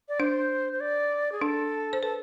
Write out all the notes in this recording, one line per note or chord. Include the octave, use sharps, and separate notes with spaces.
D5
D4 C5
C5
D5
G#4
D4 A4
C5
A4 B4